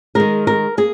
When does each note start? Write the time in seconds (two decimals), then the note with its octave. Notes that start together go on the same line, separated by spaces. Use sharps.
0.15 D#3 G#3 A#4
0.47 A#4
0.77 A#3 G#4